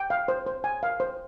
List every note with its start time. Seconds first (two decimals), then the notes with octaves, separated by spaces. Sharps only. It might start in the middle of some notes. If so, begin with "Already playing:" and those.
Already playing: G5
0.10 F5
0.28 C5
0.47 C5
0.64 G#5
0.83 F5
1.00 C5